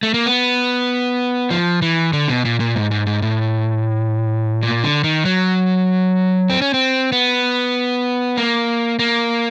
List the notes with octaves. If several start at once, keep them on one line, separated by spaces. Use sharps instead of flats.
A3
A#3
B3
F3
E3
D3
B2
A#2
A#2
G#2
G#2
G#2
A2
A#2
D3
D#3
F#3
C4
C#4
C4
B3
A#3
A#3